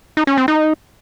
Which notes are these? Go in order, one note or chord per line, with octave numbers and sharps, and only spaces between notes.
D#4
C#4
C4
D#4